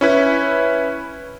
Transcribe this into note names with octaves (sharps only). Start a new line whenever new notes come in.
C#4 E4 B4